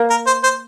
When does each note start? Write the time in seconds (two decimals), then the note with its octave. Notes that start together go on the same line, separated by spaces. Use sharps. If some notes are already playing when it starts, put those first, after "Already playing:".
Already playing: A#3
0.10 A#4
0.27 C5
0.43 C5